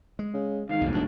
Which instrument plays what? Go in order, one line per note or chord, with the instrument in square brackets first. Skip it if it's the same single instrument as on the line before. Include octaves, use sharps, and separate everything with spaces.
[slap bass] G#3
[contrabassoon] C#3
[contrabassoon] G#2 [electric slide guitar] D3 D#3 [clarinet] F5
[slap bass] C2 F2 [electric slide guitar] B2 A3
[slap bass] F1 E2 F3 [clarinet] D4